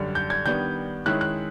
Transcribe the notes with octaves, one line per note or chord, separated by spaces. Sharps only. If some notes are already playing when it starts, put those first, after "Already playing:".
Already playing: F#2 D3 G3
G6
G#6
D#3 G3 B3 D4 G6
D#3 G#3 C#4 E4 F#6
F#6